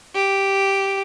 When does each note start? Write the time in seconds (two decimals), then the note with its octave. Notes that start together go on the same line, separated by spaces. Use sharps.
0.15 G4